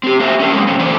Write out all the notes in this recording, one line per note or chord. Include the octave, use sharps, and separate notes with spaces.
C4 G4
A#3 F#4 C5 E5
C#4 D4 A#4
F#3 G#3 A#3 C4
A#2 C#3 C4 C#4
D3 E3 A#3 C5 D5